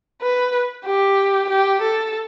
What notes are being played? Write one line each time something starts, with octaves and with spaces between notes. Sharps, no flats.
B4
G4
G4
A4